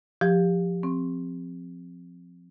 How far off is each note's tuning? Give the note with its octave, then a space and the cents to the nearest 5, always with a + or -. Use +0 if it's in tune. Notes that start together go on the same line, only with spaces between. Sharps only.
F3 +10 G4 +15
C4 +0 C#6 -15